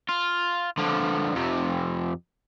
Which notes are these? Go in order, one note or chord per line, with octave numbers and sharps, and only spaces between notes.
F4
D3 F3
F2 C3